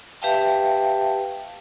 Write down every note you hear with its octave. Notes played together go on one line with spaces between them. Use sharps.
G4 B4 E5 F5 G5 A5